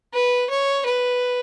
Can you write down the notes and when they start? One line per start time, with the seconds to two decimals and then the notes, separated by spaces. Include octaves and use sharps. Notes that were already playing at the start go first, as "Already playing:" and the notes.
0.14 B4
0.50 C#5
0.86 B4